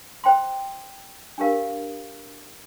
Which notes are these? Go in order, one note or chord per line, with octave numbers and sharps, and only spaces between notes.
C5 G5 C6
D4 G4 A#4 F5